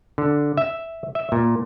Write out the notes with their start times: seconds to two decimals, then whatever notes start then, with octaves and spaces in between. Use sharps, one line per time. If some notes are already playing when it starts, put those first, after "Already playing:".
0.18 D3
0.58 E5
1.15 E5
1.32 A#2